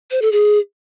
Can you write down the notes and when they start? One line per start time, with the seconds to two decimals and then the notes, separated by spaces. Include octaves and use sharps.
0.11 C5
0.22 A4
0.32 G#4